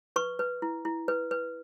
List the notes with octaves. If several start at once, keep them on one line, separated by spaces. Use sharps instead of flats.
B4 C#6
B4
E4
E4
B4
B4